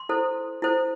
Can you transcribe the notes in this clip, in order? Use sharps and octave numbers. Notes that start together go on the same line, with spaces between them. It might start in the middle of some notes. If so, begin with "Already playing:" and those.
Already playing: C6
E4 A4 C5
E4 A4 C5